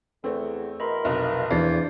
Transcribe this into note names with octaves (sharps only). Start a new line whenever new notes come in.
E2 A3 C4
B2 E3 A#4 D#5 B5 C6
F1 B1
E2 D4 C5 D5 C7